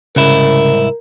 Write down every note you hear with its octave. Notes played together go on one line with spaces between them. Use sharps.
C2 G#2 C#3 E4 A#4